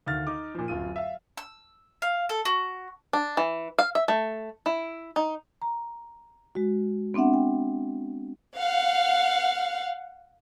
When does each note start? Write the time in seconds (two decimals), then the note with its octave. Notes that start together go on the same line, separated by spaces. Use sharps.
0.06 D2 D#3 F5 F6 A6
0.27 D#4 D6
0.55 A#2 F3
0.68 D1 F#2 F4 D#7
0.96 E5 F5
1.37 E6
2.02 F5
2.29 A4
2.45 F#4
3.13 D4
3.37 E3
3.79 F5
3.95 E5
4.08 A3
4.66 E4
5.16 D#4
5.62 A#5
6.55 G#3 F#4
7.14 B3 C4 D4 E5 F#5
7.33 G5
8.57 F5 F#5